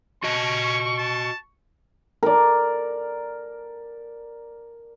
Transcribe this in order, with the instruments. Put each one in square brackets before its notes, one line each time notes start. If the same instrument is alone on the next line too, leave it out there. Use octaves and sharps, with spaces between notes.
[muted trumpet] C#4 [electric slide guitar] F#4 D#5 [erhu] C#6
[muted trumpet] A5
[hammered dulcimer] A#4 D5